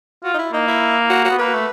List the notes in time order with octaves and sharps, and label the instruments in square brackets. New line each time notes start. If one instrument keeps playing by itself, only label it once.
[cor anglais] F4 [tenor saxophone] F#4
[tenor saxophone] D#4
E4
[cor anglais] A#3 [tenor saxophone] D#4
[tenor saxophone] E4
F#4
F#4
[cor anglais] B3
[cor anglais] A#3 [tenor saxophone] B4
[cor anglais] A3